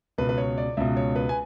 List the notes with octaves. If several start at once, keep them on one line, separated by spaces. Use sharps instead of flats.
C#2 B2 B4
B4
C#5
D5
C#2 B2 E5
C#5
B4
G#5